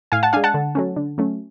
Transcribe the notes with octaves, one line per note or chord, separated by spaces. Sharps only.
A2 F5 G#5
F#5 A5
G#3 D4 F5 G#5
F#5 A5
D3
F#3 A3 C#4
D3
F#3 A3 C#4